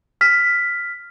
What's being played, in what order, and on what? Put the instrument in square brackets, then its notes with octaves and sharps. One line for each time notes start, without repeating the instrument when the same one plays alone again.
[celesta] F6 B6